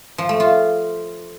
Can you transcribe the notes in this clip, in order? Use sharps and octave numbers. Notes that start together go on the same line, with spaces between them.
F3
A3
F4